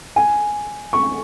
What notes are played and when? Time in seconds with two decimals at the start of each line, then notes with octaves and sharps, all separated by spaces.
0.16 G#5
0.93 C#6